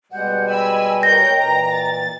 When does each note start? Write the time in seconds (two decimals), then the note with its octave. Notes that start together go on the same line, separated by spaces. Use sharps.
0.12 B2 G3 G#3 F#5 G6
0.49 D#5 G5 G#5 B5 E6
1.03 A#4 C#5 G6 A#6
1.38 A#2 E3 A#5
1.72 A6